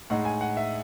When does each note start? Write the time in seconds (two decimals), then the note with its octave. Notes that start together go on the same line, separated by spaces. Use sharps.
0.10 A2 G#3 D#4 F#5
0.25 G#5
0.41 F#5
0.57 E5